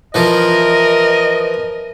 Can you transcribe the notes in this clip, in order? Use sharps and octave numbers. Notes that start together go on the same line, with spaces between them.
E3 F3 A#4 D#5